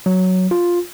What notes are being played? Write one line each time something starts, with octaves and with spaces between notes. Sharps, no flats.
F#3
F4